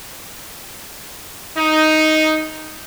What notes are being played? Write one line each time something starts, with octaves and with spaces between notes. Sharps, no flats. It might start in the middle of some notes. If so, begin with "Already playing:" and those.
D#4